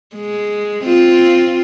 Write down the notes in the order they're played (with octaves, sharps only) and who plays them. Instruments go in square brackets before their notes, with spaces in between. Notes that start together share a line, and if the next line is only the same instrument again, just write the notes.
[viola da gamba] G#3
C4 F4